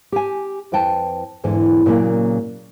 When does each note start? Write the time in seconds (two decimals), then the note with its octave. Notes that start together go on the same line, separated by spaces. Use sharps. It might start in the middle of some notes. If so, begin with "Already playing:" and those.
0.12 G4 G#5
0.72 F2 E4 B4 G5 A5
1.44 E2 G#2 D3 E3
1.86 A#2 C#3 F#3 A#3